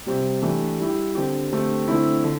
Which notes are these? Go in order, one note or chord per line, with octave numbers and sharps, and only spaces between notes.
C3 G3 C4 G4
E3 A3 D4 G4
G3 E4 G4
D3 C4 G4
D3 A3 C4 G4
D3 A3 C4 E4
D3